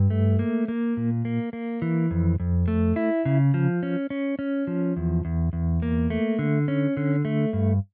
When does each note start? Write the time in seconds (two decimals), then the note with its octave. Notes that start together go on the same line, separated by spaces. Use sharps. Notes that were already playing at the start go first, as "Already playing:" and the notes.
Already playing: G2
0.10 A3
0.39 A#3
0.68 A#3
0.97 A#2
1.25 A#3
1.53 A#3
1.82 E3
2.11 F2
2.40 F2
2.68 A3
2.96 E4
3.25 C#3
3.54 F3
3.83 C#4
4.10 C#4
4.39 C#4
4.67 F3
4.97 E2
5.25 E2
5.53 E2
5.82 A#3
6.10 A3
6.39 D3
6.68 C#4
6.97 D3
7.25 A3
7.53 G2